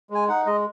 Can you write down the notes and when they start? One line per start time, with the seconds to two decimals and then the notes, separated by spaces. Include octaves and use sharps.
0.10 G#3 G#5
0.29 D#4 F#5
0.46 G#3 D#5